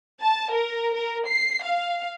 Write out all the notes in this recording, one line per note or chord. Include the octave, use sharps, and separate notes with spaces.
A5
A#4
A#4
C7
F5